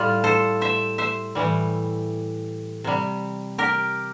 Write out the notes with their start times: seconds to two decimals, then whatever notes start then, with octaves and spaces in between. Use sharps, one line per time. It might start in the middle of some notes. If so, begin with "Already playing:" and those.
Already playing: A2 G3 F4
0.24 A4 C5
0.61 C5 E5
0.98 C5 E5
1.35 A2 E3 G3
2.84 C3 G3
3.58 G4 A#4